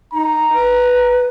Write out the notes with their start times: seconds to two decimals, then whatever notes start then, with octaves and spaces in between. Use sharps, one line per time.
0.13 D#4 A#5
0.53 B4